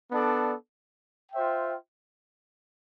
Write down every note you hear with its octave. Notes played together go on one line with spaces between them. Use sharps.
B3 D4 A4 D5
F4 C5 E5 G5